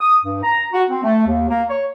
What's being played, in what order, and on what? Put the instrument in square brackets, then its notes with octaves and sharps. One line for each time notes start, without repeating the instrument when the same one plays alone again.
[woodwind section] D#6
G2
A#5
F#4
C4
A3
D#2
A#3
C#5